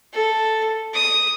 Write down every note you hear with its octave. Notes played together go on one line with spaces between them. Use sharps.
A4
D#6